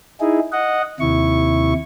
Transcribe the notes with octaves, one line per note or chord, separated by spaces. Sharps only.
D#4 E4 G#4
D#5 F#5
D#2 C3 E4 C#6